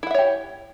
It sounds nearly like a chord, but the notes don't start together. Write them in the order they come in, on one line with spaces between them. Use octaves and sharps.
E4 F#5 E5 C#5 G4